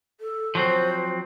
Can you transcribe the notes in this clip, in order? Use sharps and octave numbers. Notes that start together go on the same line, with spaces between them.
A4
F3 F#3 C4 C5